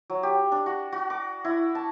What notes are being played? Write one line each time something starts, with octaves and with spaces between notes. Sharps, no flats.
F#3
G4
D4
F#4
F#4
D6
E4
A5